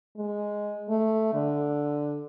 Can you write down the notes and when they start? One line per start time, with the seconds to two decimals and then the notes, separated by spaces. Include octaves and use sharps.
0.17 G#3
0.89 A3
1.33 D3